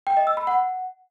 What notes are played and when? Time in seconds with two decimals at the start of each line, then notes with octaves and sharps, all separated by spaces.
0.07 G5
0.17 D#5
0.27 E6
0.37 B5
0.47 F#5